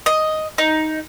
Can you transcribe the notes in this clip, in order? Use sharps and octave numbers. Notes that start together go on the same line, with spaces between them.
D#5
D#4